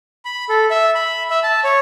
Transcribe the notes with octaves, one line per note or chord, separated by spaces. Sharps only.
B5
A4
E5
B5
E5
A5
C#5